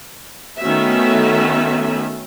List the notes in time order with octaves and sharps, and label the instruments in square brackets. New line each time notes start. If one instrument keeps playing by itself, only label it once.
[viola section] D#3 A3 B3 C#4 F#4 E5